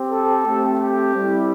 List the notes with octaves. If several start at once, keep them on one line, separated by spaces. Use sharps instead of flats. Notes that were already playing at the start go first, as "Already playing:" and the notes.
Already playing: C4 G4
A4
A3 C4 G4
G4
G3 C4 E4